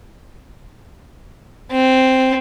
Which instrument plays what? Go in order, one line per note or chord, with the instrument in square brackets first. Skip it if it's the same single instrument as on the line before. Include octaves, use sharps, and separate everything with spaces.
[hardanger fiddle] C4